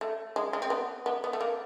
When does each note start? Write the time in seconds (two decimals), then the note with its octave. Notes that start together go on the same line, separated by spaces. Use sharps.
0.01 A3
0.36 G#3
0.53 G#3
0.62 C4
0.70 B3
1.06 B3
1.24 B3
1.33 A3
1.41 A#3